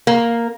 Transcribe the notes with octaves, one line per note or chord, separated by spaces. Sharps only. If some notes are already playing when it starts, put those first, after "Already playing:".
A#3